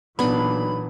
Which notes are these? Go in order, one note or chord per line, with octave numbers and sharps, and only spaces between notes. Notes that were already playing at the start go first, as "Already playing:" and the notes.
B1 A#2 E3 B3 D4 B5